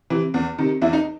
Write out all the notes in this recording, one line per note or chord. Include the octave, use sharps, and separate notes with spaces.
C3 E3
E2
C3 D#3
E2 E4
D#4